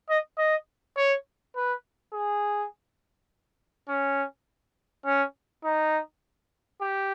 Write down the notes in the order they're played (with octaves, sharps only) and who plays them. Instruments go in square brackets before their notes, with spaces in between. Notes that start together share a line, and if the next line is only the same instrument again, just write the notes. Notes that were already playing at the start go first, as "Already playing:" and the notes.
[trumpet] D#5
D#5
C#5
B4
G#4
C#4
C#4
D#4
G4